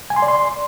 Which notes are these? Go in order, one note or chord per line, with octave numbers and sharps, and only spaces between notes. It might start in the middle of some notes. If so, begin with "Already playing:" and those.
G#5
C6
D5
C6